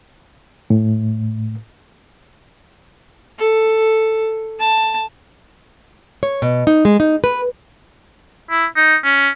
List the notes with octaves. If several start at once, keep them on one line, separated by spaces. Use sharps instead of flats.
A2
A4
A5
C#5
B2
D#4
G#3
D#4
B4
E4
D#4
C#4